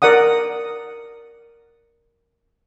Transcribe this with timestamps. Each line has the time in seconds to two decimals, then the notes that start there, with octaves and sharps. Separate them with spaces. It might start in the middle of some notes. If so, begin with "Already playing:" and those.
0.02 A#4 D5 F#5 D#6